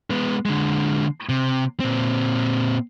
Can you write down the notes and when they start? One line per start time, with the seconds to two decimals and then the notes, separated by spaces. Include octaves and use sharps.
0.10 G#3 B3
0.46 D3 G#3
1.29 C3
1.80 A#2 C4